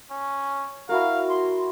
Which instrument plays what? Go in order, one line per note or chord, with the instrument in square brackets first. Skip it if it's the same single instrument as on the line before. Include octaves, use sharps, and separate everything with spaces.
[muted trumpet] C#4
[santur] E4 F#4 A#4 [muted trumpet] F5
[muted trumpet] C6